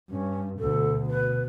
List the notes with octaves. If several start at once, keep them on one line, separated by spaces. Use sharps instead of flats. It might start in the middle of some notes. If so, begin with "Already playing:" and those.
G2 C#4
D2 B2 A4
B2 B4